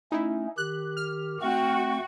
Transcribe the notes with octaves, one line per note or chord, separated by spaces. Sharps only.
A3 C#4 D#4 E4
D#3 G4 F#6
F6
A3 C4 F#4 G5 C#6